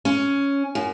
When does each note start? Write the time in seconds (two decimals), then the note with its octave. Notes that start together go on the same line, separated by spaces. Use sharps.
0.05 C#4
0.75 F#2